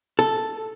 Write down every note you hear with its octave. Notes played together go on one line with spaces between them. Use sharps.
A4